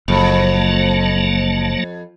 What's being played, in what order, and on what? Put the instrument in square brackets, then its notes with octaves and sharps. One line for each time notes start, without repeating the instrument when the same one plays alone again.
[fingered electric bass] F#1 [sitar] F2 [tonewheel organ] F#3 A#3 A5